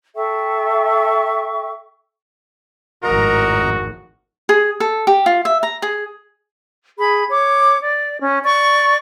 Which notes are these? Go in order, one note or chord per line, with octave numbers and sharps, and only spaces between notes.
A4 E5 G5 C#6
G#1 F2 A2 F#4 A#4 D#5 A#5
G#4
A4
G4
F4
E5
A#5
G#4
G#4 B5
C#5 D6
D5
C#4
D5 C#6